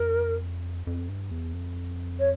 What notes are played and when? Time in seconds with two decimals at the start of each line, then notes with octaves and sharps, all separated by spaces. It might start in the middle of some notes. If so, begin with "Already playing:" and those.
Already playing: F2 A#4
0.87 F2
1.09 G2
1.31 E2
1.53 F2
2.19 C#5